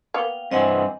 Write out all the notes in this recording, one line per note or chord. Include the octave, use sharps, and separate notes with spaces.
A#3 B3 F5 G5
G2 E3 C4 D#5 F#5 G#5